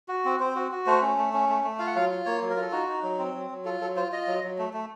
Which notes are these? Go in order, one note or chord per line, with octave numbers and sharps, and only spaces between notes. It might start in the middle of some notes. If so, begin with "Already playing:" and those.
F#4
C4
C4 C5
F#4
F#4
A3 C5
C#4
A3
C#4
A3
A3
F4 F5
F#5
F#3 F5
F4
A#3 C#5
F#3
A#4
F4 A4
D#4 F#4
D#4
F#3
C4
F#3
F#3
F4 A4
F#3 A4
F4 C5
F4 D#5
F#3
F#3
A3
A3